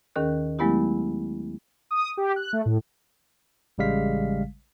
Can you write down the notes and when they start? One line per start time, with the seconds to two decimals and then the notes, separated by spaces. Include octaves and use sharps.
0.16 D#2 D#3 C#4 G#4 A#4 F#6
0.59 F#3 G#3 A3 B3 E4 G4
1.91 D#6
2.17 G4
2.36 F#6
2.53 A3
2.66 A2
3.78 A1 C#3 G3 G#3 F5 B6